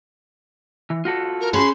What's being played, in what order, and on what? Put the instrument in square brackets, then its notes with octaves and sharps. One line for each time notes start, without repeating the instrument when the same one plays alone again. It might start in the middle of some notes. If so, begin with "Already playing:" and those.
[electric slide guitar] E3
F4 F#4 A4
[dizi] A#4
[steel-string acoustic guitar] C#4 G#4 B4 [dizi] C6